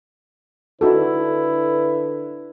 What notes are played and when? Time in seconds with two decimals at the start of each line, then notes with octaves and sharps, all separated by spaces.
0.81 D3 D#4 E4 F#4 A4 B4